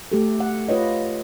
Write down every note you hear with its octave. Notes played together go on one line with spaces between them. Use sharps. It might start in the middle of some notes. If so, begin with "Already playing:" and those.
A3 G4 A4
F#5
F4 B4 C#5 D#5